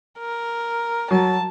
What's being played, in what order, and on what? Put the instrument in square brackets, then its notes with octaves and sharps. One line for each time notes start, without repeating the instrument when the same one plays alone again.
[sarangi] A#4
[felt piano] F#3 [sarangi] A5